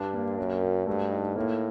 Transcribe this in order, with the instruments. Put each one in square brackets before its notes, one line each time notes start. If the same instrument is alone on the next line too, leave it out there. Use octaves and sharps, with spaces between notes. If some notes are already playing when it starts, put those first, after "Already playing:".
Already playing: [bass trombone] G2 [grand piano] D4
[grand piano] A#3
[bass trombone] F#2 [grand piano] A#4
[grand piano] F#4
[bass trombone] G2 [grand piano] A3
[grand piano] D#4
[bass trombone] A2 [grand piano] A#3